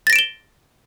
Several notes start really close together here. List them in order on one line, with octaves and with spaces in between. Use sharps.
A6 A#6 D7 E7 G7